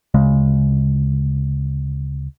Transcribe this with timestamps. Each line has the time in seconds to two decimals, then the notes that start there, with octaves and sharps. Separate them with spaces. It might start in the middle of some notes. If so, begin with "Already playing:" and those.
0.14 D2 C#3 G#3